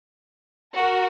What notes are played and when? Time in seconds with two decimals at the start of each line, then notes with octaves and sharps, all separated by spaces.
0.75 F#4 A#4